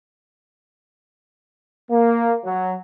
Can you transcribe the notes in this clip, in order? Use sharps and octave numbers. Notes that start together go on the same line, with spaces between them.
A#3
F#3